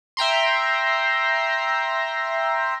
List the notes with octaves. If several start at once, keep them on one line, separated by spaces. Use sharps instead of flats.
E5 G5 A#5 C6